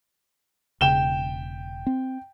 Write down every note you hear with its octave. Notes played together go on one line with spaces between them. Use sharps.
E1 C#3 G5 E7 G7
C4